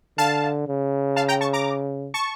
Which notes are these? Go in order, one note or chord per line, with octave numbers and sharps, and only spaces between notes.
D3 F5 A5
C#3
F5 A5
G5 A#5
A5 C#6
A#5 D6
A5 C#6